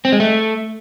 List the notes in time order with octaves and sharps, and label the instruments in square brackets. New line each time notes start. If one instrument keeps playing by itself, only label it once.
[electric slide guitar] C4
G#3
A3